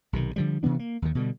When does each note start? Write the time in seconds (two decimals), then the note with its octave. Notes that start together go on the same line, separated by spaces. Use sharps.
0.13 B1 C3 D#3
0.36 D3 F3 G3
0.63 C3 E3 B3 D4
0.79 A#3
1.02 D#2 D#3
1.15 B2 D3 G3